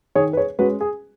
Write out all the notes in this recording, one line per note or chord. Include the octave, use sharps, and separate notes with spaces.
D#3 G#4 C#5
B4
G#4 C#5
G#3 C#4 F#4 B4
G#4